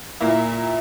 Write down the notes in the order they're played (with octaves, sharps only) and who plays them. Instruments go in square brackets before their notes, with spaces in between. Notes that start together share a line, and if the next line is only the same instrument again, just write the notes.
[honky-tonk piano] A#2 A#3 E4